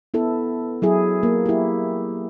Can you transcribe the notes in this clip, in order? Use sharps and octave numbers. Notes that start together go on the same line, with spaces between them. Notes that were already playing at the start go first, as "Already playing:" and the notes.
B3 E4 A4
F#3 E4 G#4
A#3
E4 G4